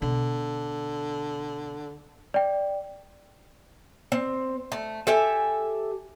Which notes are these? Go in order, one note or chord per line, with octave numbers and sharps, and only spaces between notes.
B2 D3
D5 G5
C4
A3
G4 A4 E5 G#5